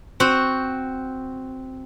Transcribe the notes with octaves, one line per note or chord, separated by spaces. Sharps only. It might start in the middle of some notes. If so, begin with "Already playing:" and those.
C4 F#4